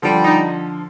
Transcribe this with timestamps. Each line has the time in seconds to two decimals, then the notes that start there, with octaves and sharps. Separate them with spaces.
0.02 D3 F3 G3
0.23 D#4